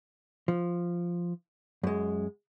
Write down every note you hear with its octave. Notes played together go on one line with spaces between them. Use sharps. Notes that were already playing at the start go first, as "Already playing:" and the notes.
F3
F#2 G#3